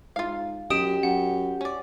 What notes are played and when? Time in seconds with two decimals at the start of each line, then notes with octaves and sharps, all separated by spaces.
0.16 G#2 F4 F5
0.70 F#2 G4 D#5 D#6 D7 E7
1.03 F#2 F#5
1.61 C#4 D5